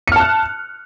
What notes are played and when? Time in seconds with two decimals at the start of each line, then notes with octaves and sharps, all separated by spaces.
0.08 C#7
0.12 F6
0.16 A5
0.20 F#6